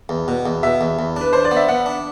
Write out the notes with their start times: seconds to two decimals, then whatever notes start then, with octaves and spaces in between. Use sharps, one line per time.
0.09 E2
0.28 B2
0.46 E2
0.63 B2 E5
0.81 E2
0.99 E2
1.16 D4 B4
1.33 D4 C5
1.45 D5
1.51 B3
1.56 E5
1.68 B3 F#5
1.86 D4